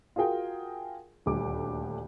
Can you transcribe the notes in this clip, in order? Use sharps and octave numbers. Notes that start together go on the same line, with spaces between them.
F4 F#4 G#4 A#4 G5 G#5
D#1 D2 D6